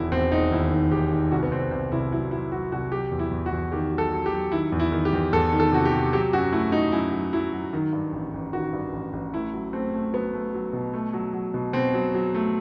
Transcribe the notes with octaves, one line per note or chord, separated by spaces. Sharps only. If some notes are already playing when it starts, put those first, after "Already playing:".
Already playing: E1 D#3 E4
E1 C4
E1 D#4
D#2 E4
D#3
E1 G4
D#3
C2 F#4
B3
C2 C4
C2 C4
C2 E4
F#3 E4
F#3 E4
F#3 F#4
C2 F#4
F#3 G4
E2
E4
E2
F#4
E2
D#3 G4
F#3
A4
F#3
G4
F#3
D#3 E4
E2
E4
D#3
G4
E2
E2 A4
D#3
A4
C3 F#4
G4
C3
F#3 G4
F#2 F#4
A3 E4
F#3 D#4
F#2 E4
F#3
F#3 E4
F#3
D#3
G2
A1
A1
D#3 F#4
G2
A1
A1
A3 E4
F#3
A3 C4
A3
F#3 B3
A3
F#3
B2
A3
F#3
F#3
B2
B2 C4
F#3
F#3
A3